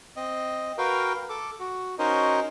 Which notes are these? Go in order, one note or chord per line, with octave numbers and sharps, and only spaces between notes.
C4 D#5
F#4 A#4 B4 F5 G5
A4 D6
F#4
C#4 D#4 F#4 A#4 C5 D#5